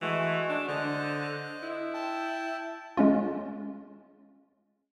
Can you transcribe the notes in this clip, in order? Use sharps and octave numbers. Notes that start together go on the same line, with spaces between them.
E3 G#3 A3 F#4
D4
D3 C5 D#5 F#6
E4
G5 A5
G#3 C#4 F4